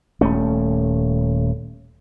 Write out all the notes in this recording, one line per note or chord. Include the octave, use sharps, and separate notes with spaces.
D#1 A3 C#4